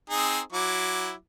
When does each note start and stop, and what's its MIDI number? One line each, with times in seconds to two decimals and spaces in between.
0.10 0.39 60
0.10 0.39 63
0.10 0.39 68
0.52 1.12 54
0.52 1.12 64
0.52 1.12 86